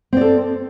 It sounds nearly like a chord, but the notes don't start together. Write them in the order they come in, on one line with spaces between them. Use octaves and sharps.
C4 D5 A4